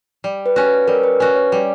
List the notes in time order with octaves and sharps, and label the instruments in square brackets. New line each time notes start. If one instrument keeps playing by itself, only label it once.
[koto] G3
[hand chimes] B4
[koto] C#4 F#4
[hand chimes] B4
[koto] G3 [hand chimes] A#4
[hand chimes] B4
[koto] C#4 F#4 [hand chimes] B4
[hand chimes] C#5
[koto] G3 [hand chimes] D5